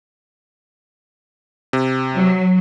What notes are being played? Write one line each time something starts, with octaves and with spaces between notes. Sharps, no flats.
C3
F#3